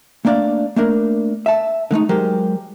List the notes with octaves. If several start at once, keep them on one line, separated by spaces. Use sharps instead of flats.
A3 A#3 D4 D5 F5
A3 A#3 D4 A#4
E5 A5
D3 G#3 A3 D#4
F#3 G#3 G4 A#4 C5